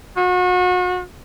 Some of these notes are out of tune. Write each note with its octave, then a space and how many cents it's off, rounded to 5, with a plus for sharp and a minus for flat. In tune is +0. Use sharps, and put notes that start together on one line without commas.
F#4 -35